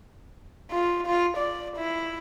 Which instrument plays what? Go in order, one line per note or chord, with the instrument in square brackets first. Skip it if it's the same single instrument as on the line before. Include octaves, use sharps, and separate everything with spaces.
[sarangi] F4
F4
D5
E4